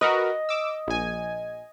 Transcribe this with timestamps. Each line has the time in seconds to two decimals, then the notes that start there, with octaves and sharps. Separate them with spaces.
0.01 F#4 A#4 B4 D#5
0.49 D6 E6
0.87 A#1 G#5